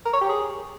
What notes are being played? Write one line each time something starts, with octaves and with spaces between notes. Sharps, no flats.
A#4
C#5
G4
G#4